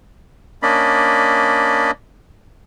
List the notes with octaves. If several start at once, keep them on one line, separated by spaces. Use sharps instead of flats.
A#3 C#4 D4 D5 D#5 B5